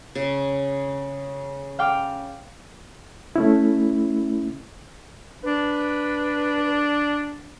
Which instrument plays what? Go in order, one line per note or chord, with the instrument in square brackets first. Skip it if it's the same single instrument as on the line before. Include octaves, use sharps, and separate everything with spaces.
[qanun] C#3
[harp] F5 G5 D6
[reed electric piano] A3 C#4 E4
[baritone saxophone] D4 [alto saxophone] B4